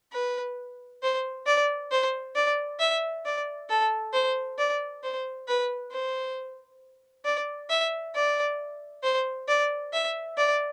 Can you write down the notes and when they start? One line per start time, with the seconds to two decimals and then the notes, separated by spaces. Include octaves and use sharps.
0.13 B4
1.03 C5
1.46 D5
1.91 C5
2.35 D5
2.80 E5
3.25 D5
3.70 A4
4.13 C5
4.58 D5
5.03 C5
5.48 B4
5.92 C5
7.25 D5
7.70 E5
8.15 D5
9.03 C5
9.48 D5
9.93 E5
10.37 D5